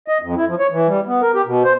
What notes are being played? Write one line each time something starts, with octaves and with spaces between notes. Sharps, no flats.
D#5
F2
E4
F3
C#5
E3
G3
B3
A#4
G4
B2
C5